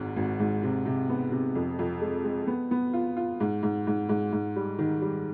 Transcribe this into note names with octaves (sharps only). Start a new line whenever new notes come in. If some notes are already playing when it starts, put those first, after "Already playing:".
Already playing: G#1 G#2
G#1
G#2
C3
C3
B3
C3
F2
F2
G#3
G#3
B3
B3
F4
F4
G#2
G#2
G#2
G#2
G#2
G3
D#3
G3